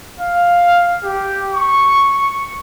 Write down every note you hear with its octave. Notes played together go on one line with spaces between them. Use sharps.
F5
G4
C#6